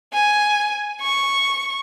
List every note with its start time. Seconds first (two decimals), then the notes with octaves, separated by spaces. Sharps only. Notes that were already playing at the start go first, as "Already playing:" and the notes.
0.13 G#5
1.02 C#6